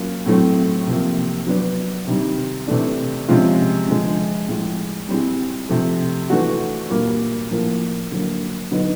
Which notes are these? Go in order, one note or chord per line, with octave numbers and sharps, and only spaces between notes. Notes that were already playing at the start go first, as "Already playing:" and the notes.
Already playing: F#3 A#3 C#4 F4
A2 F#3 A3 C4
C3 F3 A#3
F#3 B3 D4
C3 D#3 G3
C3 E3 A3 D4
C3 F3 G#3 C#4 F4
D3 F3 G#3
A2 F3 G#3
G3 C4 E4 G#4
C3 F3 A3
E3 A3 D4 F#4
A#2 G3 A#3
A2 F3 A#3
D3 F#3 A#3
D3 F#3 B3 D#4